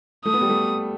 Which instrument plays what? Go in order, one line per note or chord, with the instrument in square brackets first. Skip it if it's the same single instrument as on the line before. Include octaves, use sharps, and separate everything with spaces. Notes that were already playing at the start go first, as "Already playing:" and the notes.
[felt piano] A3 [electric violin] D#6
[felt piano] B3
G3
A3